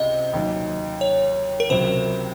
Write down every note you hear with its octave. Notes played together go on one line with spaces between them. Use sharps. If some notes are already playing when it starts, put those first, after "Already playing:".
Already playing: C#2 C3 D#5
D#2 D#3 F#3
C#5
A#4
C#2 C3 F#3 C5